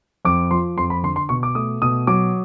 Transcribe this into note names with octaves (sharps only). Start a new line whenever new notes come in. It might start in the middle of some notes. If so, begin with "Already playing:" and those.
F2 D6
F3 C6
F2 C6
B5
D3 C6
C6
B2 C#6
D6
A3 D#6
B2 D#6
F#3 D6